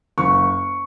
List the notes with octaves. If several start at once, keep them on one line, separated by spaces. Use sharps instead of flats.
F#1 C#6